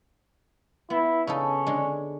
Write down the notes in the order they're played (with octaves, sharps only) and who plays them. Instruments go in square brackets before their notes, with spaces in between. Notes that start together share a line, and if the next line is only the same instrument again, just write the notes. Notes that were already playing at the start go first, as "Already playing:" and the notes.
[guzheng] B3 [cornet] E4
[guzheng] C#3 D#4 A4 [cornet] C#4
[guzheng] D3 G#3